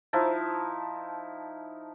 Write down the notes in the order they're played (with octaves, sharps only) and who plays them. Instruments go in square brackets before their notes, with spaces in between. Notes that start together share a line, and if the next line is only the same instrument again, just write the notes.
[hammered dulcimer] F3 D#4 E4 A5